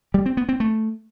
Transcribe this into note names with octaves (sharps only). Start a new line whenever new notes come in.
G3
C4
B3
C4
A3